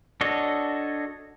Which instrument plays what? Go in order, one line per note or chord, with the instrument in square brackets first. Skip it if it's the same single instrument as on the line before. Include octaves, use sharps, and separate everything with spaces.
[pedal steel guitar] D4 F#4 A4 C#5 D#5